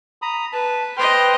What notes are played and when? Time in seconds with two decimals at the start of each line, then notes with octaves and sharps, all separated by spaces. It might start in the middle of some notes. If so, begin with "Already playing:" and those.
0.22 A#5 B5 D#6
0.53 B4 A5
0.97 B4 C5 D#5 G5 C6 F6